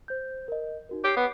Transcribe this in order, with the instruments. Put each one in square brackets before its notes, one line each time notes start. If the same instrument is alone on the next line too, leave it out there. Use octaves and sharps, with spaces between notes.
[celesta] C5 G6
A#4 D#5
D#4 F#4 A#4
[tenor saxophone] G4 [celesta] C#5 C7
[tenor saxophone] B3